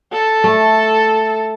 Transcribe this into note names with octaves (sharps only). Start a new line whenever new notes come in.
A4
A3